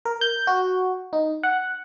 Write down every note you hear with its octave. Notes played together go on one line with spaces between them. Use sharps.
A#4
G6
F#4
D#4
F#5